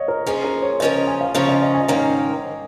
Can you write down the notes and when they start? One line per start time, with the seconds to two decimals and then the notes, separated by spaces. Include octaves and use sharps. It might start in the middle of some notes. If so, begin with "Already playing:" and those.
Already playing: C#5 D#5 F5
0.08 A#4
0.27 F3 A#3 C#4 F4 G#4
0.44 A#4
0.62 C#5
0.80 C#3 F3 C#4 F4 A#4 D#5
1.07 G#5
1.21 F5
1.34 C#3 F3 C#4 F4 A#4 F5
1.49 D#5
1.62 D#5
1.75 G#5
1.88 G#2 D#3 A#3 C#4 A#4 F5